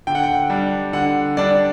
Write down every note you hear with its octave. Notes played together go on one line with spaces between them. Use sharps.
D3 G5
F#5
G5
G3 D4
D3 F#5
G3 D4 D5